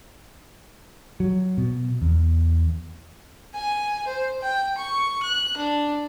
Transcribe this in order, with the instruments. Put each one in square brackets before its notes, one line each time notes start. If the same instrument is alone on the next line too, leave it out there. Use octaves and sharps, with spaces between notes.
[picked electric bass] F#3
B2
E2
[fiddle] G#5
C5
G5
C#6
F#6
D4